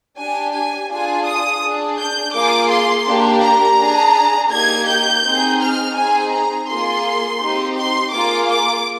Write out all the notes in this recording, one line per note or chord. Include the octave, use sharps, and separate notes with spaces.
D4 G4 G#5
G#5
D4 F4 G#4 G#5
D#6
D4 G#4
G6
A#3 F4 G#4 D6
C6
A#3 D4 G4
A#5
D4 G#4
A#3 D#4 G4 G#6
G6
C4 D#4 G#4
F6
C4 D#4 G#4 G#5
A#5
A#3 F4 G#4 C6
C4 D#4 G4
C6
A#3 F4 G#4 D6
D6